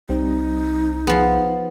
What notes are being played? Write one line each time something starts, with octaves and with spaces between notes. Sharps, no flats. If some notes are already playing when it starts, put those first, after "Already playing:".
C2 G3 C4 D#4
F3 B3 G#4